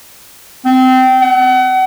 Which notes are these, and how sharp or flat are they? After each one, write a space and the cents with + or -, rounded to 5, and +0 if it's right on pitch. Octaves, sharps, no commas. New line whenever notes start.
C4 -20
F#5 +35